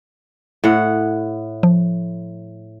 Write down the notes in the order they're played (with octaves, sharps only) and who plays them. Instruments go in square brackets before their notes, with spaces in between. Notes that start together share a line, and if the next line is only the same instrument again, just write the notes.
[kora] A2 F#5
[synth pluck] F3